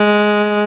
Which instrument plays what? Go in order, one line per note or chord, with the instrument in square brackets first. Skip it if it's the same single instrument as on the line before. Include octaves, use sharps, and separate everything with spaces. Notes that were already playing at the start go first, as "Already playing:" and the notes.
Already playing: [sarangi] G#3